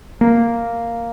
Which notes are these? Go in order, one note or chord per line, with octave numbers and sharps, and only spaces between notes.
A#3